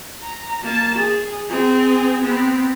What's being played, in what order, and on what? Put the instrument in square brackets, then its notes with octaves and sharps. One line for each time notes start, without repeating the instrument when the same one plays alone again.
[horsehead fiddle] A#5
A#3 A5
G#4
C4 G#4
B3 C4